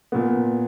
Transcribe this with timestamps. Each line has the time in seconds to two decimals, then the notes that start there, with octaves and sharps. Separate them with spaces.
0.12 A#2 B3